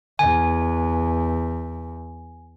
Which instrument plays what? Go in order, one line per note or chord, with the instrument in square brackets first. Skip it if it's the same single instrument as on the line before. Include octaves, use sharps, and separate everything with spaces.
[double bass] E2 [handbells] G#5